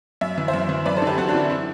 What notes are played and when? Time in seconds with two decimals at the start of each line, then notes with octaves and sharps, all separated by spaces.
0.21 F#2 E5
0.38 E3
0.48 C5 E5
0.54 F#2
0.69 E3
0.86 F#2 B4 D5
0.96 A4 C5
1.02 D3 G4 B4
1.18 F#2 F#4 A4
1.28 D4 F#4
1.34 D3
1.39 E4
1.50 E4